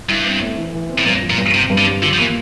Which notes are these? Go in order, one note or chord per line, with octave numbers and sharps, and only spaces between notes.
G2 E4
C4
A3
E3
E3
C4
A2
G2 A#2
F3
A#2
G2
C3 C4
G2
D3
G3
D3 F4
F3
E3 A#3